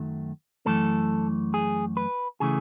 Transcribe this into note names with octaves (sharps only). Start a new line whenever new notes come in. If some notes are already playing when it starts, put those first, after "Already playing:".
Already playing: F#2 D#3 F#3 A3
F#2 E3 A3 A4
G#4
B4
C#3 E3 A3 G#4